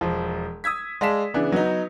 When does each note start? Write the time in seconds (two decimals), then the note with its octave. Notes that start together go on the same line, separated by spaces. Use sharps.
0.01 E1 F3
0.64 D#6 E6 G#6 B6
1.01 G#3 D5 F5 A5 B6 E7
1.34 C#3 E3 B3 D4
1.52 F#3 B3 D#4